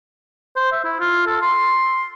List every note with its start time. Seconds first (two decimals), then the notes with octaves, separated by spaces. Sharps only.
0.56 C5
0.72 E5
0.84 E4
1.00 F4
1.27 A4
1.42 C6